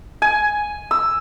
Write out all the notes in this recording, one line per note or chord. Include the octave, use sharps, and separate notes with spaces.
G#5
E6